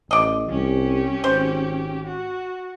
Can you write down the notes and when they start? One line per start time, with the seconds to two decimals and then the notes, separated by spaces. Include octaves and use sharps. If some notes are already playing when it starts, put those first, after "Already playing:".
0.11 A1 D5 D#5
0.49 C2 C#4 G4
1.24 G#1 C5
2.06 F#4